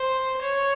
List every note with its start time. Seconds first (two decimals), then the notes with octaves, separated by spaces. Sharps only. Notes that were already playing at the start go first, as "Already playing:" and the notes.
Already playing: C5
0.41 C#5